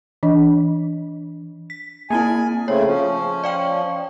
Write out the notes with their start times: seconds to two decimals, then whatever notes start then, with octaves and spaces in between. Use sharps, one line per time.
0.23 E3 D4 D#5
1.70 B6
2.10 A#3 C4 E4 G#5
2.68 C#3 A3 C4 C#5
2.85 F3 C#4
3.44 D5 F5 G5